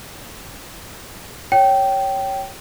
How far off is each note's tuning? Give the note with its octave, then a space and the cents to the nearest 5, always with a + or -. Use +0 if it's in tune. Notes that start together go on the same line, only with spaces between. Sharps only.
C#5 +0 G5 -15